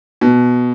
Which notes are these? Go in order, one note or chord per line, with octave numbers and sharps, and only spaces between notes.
B2